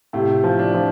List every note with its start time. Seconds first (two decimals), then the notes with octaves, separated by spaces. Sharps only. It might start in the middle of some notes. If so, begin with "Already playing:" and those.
0.13 A2 C3
0.44 F3
0.59 D4
0.74 F3